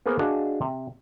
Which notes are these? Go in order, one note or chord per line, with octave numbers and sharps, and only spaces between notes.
A#3 B3 G#4 A#4 C5
D4 F#4 G#4 D#5 F5 A5
C3